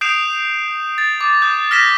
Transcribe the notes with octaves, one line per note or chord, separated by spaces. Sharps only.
D#6 G6 C7 D7 E7 F7
A6
D6
D#6 G6
F6 A#6 B6 E7